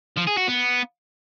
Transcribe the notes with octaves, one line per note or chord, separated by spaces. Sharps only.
F3
G#4
F#4
B3